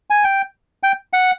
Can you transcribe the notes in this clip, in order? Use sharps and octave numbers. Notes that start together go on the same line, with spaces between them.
G#5
G5
G5
F#5